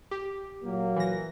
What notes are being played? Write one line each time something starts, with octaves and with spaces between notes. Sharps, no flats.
G4
A#2 F#3 A#3
E3 A#6